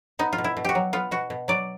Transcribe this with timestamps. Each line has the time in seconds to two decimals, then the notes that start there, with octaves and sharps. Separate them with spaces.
0.19 B3 D#4
0.33 F4
0.38 B2
0.44 E4
0.57 B2
0.65 F#4 G4
0.75 F#3
0.93 B3 F4
1.11 B2 F#4
1.30 B2
1.48 F#3 D5